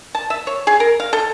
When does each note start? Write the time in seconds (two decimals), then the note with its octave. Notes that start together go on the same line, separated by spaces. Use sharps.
0.15 A5
0.30 E5
0.47 C#5
0.67 G#4
0.80 A#4
1.00 F5
1.13 A4